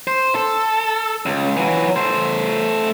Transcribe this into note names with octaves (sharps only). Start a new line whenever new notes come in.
C5
A4
C#2
E3 F#3
A3 C5